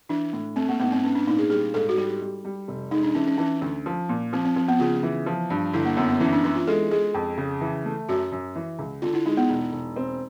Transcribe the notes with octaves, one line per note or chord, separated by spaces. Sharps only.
E3 D4
A2
A3 C4
A#3
G#2 B3
C4
B3 C#4
D4
A#2 D#4
G#4
G3 G#4
G#2 A4
F#4
G3 G4
G3
G3
F1
G#3 D#4
D4
E3 C#4
C#4
E3 C#4
D2
F3
A#2
F3 C4
C4
F3 C4
B3
C#3 F4
E3
F3
G2
G1 E4
A#3
F#2 B3
B3
E3 C#4
D4
E3 E4
F4
G#3 A4
G#3 G#4
F2
C#3
E3
A3
F#2 F#4
F#2
E3
C#2
D3 F4
E4
G#3 D#4
B3
E1
E1
C4